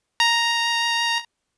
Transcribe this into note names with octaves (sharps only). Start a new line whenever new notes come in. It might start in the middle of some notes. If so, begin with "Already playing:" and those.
A#5